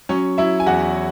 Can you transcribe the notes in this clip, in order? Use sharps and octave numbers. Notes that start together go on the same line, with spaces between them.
F#3 C#4 C#5
F#3 E4 E5
G#5
E2 F#4 F#5